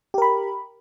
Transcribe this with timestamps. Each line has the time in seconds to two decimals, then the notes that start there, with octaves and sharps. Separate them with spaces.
0.14 G4
0.18 A#4
0.22 B5